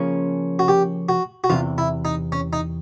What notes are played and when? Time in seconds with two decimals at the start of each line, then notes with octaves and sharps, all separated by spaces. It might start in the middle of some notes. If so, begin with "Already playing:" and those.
Already playing: C#3 F3 A#3 C#4
0.59 F#4
0.68 G4
1.09 F#4
1.44 F#4
1.50 E2 C3 E3 F4
1.78 E4
2.05 D#4
2.32 C#4
2.53 D#4